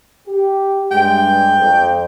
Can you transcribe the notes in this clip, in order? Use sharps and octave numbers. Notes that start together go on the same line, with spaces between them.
G4
G2 G#3 G5
F2